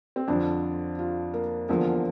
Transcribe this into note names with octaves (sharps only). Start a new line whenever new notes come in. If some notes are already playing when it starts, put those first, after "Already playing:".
C4
F2 D3 F3 D4
F4
A#3
E2 D3 F3 A#3